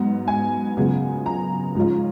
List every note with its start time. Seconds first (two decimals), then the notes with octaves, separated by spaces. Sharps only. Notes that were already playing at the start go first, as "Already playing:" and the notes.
Already playing: G#2 F#3 B3
0.28 G#5
0.77 F#2 C#3 G#3 B3 F4
1.26 A#5
1.75 G#2 F3 G#3 C#4 F4